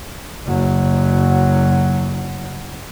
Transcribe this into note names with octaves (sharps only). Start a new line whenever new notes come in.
F#1 F#3